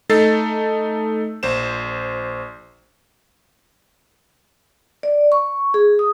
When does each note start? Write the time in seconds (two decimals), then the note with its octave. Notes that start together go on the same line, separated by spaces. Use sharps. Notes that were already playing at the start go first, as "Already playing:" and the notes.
0.09 A3 D#4 A4 A6 C7
1.43 A#1 C5 E7
5.03 D5
5.32 C#6
5.74 G#4
5.99 D#6